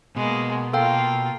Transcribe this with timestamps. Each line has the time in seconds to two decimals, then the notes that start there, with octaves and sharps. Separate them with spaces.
0.16 B2 G#3 A#3
0.73 A#3 F4 A4 F5 G5